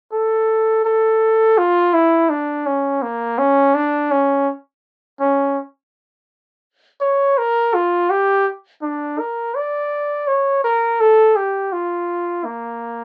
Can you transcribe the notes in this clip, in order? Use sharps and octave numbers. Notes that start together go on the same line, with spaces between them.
A4
A4
F4
E4
D4
C#4
A#3
C#4
D4
C#4
C#4
C#5
A#4
F4
G4
D4
A#4
D5
C#5
A#4
A4
G4
F4
A#3